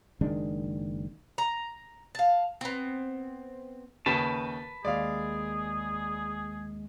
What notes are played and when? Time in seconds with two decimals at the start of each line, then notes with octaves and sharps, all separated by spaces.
0.21 F#1 D#3 G#3 D4
1.38 A#5
2.15 F5 A5
2.61 B3 C4
4.06 D#2 C#3 B4 A5
4.85 D#2 G#3 G#4 D5 F5